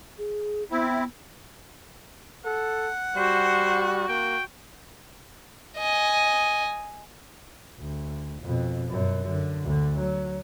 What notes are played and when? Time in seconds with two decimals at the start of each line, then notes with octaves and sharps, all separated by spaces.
0.18 G#4
0.71 B3 C4 E4
2.45 A4 F#5
3.17 G3 F#4 C5
4.09 A#3 G5
5.78 D#5 G#5
7.79 D2
8.43 F2 B2
8.90 F#2 B2
9.28 D3
9.64 D2 D3
9.99 F#3